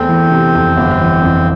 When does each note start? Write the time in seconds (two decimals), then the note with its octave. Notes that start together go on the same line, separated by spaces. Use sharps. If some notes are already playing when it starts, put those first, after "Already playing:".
Already playing: E2 A3 C4
0.08 E3
0.31 C3
0.55 F2
0.76 G1
1.00 E3
1.22 F2